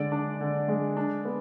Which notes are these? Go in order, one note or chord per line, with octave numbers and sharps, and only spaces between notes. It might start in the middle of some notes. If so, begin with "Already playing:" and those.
Already playing: D3 G#3 D5
D4
D3
G#3
D4
B3